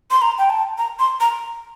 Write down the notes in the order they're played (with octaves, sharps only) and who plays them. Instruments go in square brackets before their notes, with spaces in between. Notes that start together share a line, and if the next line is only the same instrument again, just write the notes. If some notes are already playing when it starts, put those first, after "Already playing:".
[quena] C6
A#5
G5
A5
A#5
C6
A#5